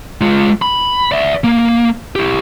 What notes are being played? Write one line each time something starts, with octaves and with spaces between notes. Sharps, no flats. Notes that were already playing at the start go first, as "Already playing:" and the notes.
G#3 F4
B5
D5 E5
A#3
E4 G4